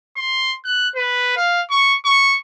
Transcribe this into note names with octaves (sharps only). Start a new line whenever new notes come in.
C6
F#6
B4
F5
C#6
C#6